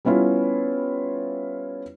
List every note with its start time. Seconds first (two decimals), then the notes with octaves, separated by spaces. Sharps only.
0.05 G3 B3 C#4 E4 F4